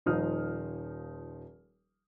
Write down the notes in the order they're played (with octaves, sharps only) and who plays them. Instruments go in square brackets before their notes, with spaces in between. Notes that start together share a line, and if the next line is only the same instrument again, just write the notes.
[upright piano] D#1 F3 D#4 C5 D#6 F6